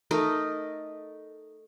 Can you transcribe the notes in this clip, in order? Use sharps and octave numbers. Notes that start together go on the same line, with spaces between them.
A3 D#4 A#4 D#5